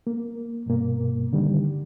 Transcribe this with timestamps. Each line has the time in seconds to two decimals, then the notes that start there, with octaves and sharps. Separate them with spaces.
0.07 A#3
0.66 G2 B2 A#3
1.33 D3 D#3 G3